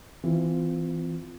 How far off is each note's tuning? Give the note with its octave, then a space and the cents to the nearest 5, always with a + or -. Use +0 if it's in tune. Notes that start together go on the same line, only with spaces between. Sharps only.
E3 +0 C4 -35 F4 +0